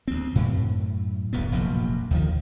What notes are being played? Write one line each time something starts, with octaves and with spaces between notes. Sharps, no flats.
D2 C4
F#2 A2
D1 B1 F2 B3
F1 A#1 F#2
D2 D#3 F3